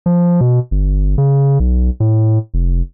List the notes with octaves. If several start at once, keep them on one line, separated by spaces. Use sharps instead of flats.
F3
B2
G1
C#3
B1
A2
F1